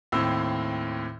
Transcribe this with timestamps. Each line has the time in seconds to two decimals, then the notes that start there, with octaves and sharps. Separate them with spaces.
0.12 D#2 A2 C4 E6